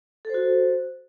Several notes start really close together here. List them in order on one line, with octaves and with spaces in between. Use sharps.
A4 C5 F#4